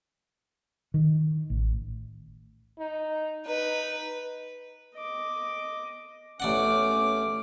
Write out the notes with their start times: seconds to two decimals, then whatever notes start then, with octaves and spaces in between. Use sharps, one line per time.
0.94 D#3
1.50 A1
2.79 D#4
3.46 D#4 B4
4.96 D#5 D6
6.40 A1 C#4 D5 F#5 D6